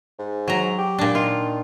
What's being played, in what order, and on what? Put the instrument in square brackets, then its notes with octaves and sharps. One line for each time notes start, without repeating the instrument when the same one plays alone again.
[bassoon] G#2
[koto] F#3 A#5
[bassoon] G4
[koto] A#2 D4
[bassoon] D#3 [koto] F4